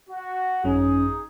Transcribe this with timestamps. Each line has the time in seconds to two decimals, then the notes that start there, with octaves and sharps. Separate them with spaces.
0.10 F#4
0.64 G#1 F#2 F#3 C#4 D#4 G#4